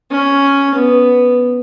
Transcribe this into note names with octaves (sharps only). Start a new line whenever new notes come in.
C#4
B3